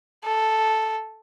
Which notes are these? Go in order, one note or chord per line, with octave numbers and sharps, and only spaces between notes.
A4